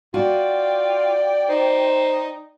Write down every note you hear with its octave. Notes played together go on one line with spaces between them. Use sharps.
F4 F#4 D5 G5
D#4 C5